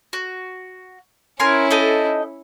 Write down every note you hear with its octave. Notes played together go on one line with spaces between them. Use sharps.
F#4
C#4 E4 A#4 G#5 C6
D#4 A4 D#5